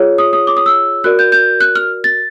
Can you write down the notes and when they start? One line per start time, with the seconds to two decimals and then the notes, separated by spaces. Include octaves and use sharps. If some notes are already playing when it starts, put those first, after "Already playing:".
Already playing: F4 G#4 C#5
0.18 D#6
0.33 D#6
0.47 D6
0.57 D#6
0.66 E6
1.04 F#4 A#4 D5 F#6
1.19 G6
1.32 G6
1.61 F#6
1.76 F6
2.04 A6